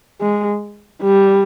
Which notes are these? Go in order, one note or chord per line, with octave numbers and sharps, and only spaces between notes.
G#3
G3